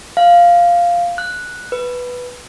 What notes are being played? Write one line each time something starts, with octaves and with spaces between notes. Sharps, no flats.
F5
F#6
B4